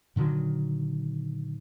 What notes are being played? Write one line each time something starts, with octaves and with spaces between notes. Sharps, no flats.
A#2 D3 D#3 F#3